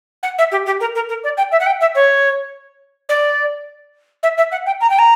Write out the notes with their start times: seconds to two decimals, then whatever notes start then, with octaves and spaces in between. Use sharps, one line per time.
0.23 F#5
0.38 E5
0.52 G4
0.66 G4
0.81 A#4
0.95 A#4
1.09 A#4
1.24 D5
1.38 G5
1.52 E5
1.60 F#5
1.66 G5
1.81 E5
1.95 C#5
3.09 D5
4.23 E5
4.38 E5
4.52 F#5
4.66 G5
4.81 A#5
4.90 G5
4.99 A#5